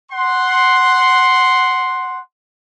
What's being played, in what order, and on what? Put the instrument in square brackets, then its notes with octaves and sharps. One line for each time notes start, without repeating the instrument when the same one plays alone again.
[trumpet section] F#5 C6